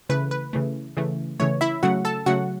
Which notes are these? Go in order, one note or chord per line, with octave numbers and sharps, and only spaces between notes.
C#3 E3 A3 B4
B4
C#3 E3 A3
C#3 E3 A3
C#3 E3 A3 C#5
E4 E5
C#3 F#3 A3 F#4 F#5
A4 A5
C#3 F#3 A3 F#4 F#5